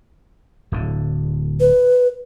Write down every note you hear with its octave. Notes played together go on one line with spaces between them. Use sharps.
D1 D3
B4